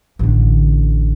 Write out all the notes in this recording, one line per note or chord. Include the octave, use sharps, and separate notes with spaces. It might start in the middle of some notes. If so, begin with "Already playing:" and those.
A1 D3